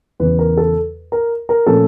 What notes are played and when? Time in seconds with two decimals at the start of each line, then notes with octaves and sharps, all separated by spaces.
0.20 E2 C#3 E3 B4
0.39 A#4
0.57 A4
1.12 A#4
1.49 A#4
1.67 A#2 F3 A3 C#4 A4